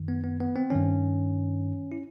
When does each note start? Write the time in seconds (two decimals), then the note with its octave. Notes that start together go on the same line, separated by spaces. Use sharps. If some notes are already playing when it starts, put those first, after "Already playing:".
Already playing: F#2 D#3
0.08 B3
0.24 B3
0.40 B3
0.56 C4
0.70 G2 D#3 C#4
1.92 E4